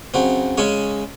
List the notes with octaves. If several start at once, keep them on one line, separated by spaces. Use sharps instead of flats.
C#3 F#3 C4
C#3 G#3 C#4 C#5